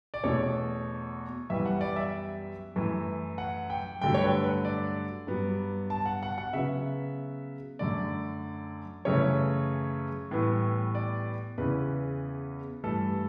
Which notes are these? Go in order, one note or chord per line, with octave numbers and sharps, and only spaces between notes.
D5
E2 B2 A3 C#5
F#2 E3 G3 B3 E5
F#5
D5
E5
F#2 E3 A3
F#5
G5
G2 D3 F#3 A3 G5
C#5
B4
B4
D5
G2 F#3 B3
A5
F#5
F#5
F#5
C#3 F#3 B3 E5
F#2 D3 A3 D5
F#2 C#3 E3 A3 C#5
A2 E3 G3 B3
D5
E2 C#3 E3 B4
G2 E3 A3 A4